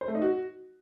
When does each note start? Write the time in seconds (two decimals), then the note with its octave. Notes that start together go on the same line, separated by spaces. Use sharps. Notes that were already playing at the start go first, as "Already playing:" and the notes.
0.01 C5
0.08 A3
0.15 D#4
0.22 F#4